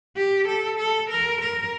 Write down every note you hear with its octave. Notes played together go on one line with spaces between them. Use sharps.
G4
A4
A4
A#4
A#4